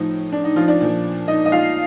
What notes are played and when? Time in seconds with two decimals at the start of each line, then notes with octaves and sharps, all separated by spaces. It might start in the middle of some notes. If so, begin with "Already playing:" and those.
Already playing: A2 F3 D#4
0.32 D4
0.44 D#4
0.56 F3 F4
0.68 D4 D5
0.81 A#2 F3
1.28 D#4 D#5
1.46 D#5
1.52 F4 F5